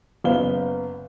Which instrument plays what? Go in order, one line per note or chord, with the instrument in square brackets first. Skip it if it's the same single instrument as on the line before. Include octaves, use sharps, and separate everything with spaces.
[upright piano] F#1 B3 F5 G7